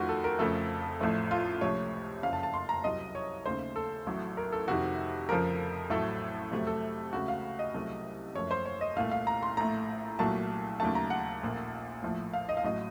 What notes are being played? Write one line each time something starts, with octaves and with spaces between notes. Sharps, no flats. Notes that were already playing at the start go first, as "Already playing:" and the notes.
Already playing: F2 D#3 A3 F4 F#4
A4
A#4
F1 F2 C#3 F3 A3 A4
A1 A2 F3 A3
F4
C#2 C3 F3 A3 C#5
F#1 F2 C#3 F5
A5
A5
C6
A#5
C2 C3 F#3 D#5
C#5
D#2 C#3 A3 C5
A4
A1 A2 F#3 A3
A#4
A4
F2 C3 D#3 F#4
F1 F2 C#3 F3 A#4
A1 A2 F#3 A3 A4
F2 C3 F#3 A3
A4
C#2 C#3 A3 F#4
F5
D#5
C2 C3 F#3 A3
F#1 F#2 F3 A3 C#5
C5
C#5
D#5
C2 A#2 A3 F5
F5
A#5
C6
A#1 A2 A3 A#5
C2 A#2 F#3 A3 A5
D#2 C#3 F#3 A3 A5
A#5
F#5
A#1 A#2 A3
A#1 A2 F3 A3
F5
D#5
F5
A1 A2 F#3 D#5